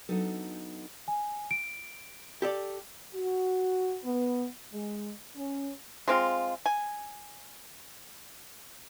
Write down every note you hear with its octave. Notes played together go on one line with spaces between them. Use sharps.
F#3 B3 D4 D#4 A4
G#5
D7
G4 A4 D5
F#4
B3
G#3
C#4
G#3 C4 F4
G#5